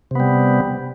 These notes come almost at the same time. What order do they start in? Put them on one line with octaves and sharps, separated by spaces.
C3 B3 G3